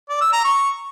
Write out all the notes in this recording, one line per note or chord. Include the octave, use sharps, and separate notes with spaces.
D5
E6
A#5
C#6